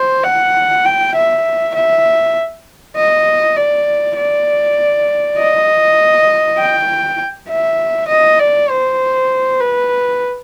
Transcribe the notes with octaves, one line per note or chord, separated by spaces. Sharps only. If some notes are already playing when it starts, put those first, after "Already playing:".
Already playing: C5
F#5
G5
E5
E5
D#5
D5
D5
D#5
G5
E5
D#5
D5
C5
B4